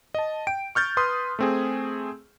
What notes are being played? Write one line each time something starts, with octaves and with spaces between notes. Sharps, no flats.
D#5 A5
G5 D7
C#6 F6 G6 A6
B4 C6 D#6
A3 C4 G#4